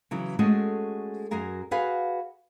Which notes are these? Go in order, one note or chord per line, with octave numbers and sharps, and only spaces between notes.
C#3 E3 F#3
G#3 A3 C#4 F#4 G#4 A4
F#2 F#4 G#4 A#4 G#5
F#4 G#4 B4 F5 G#5